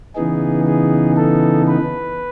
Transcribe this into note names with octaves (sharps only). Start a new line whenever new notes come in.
C#3 E3 B3 D#4 G#4
G#4
A4
B4